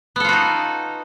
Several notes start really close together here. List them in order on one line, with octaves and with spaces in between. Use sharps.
B3 A4 F4 F#4 D#4